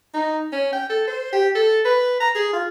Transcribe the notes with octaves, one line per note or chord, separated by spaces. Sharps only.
D#4
C#4
G5
A4
C5
G4
A4
B4
A#5
G#4
F4